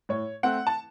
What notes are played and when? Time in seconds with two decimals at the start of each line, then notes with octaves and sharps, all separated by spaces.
0.09 A2 C#5
0.43 A3 C4 F#5
0.67 A5